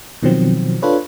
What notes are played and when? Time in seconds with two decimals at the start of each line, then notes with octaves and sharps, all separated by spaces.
0.23 B2 D#3 F3 F#3 C4
0.82 D4 F4 A4 B4 C#5